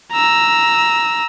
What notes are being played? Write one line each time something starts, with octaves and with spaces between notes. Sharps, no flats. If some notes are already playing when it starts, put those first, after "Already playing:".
A#5 E6